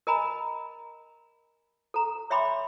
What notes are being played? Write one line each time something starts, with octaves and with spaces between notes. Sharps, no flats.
A#4 D#5 G#5 A#5 B5
A4 A#5
C#5 E5 G5 B5 C6 D6